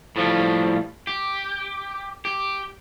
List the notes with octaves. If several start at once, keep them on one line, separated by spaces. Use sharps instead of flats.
A2 F3 G3
G4
G4